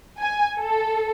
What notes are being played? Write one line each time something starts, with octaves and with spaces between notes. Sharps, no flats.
G#5
A4